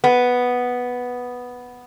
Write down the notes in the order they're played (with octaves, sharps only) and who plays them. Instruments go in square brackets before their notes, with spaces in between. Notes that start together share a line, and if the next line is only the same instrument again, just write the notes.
[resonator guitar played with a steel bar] B3